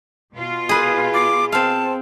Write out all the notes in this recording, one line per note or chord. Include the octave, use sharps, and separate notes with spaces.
B2 F4
G#4 B4 D#6
D6
C4 F5 A5